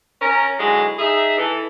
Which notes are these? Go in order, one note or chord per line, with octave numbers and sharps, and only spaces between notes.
C#4 A#4
G#2 D3 F#3 G#3 E4 G#5
D#4 G#4 E5
E3 A4